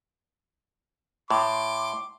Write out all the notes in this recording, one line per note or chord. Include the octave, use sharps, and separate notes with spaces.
A2 C6 D6